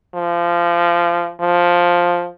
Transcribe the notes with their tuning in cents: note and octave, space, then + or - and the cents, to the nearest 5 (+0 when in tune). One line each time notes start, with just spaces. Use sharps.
F3 -20
F3 +5